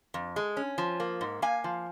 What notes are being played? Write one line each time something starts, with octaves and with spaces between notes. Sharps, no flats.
F2
G#3
C#4
F3
A#3
G#2
A#3 F5 G#5
F3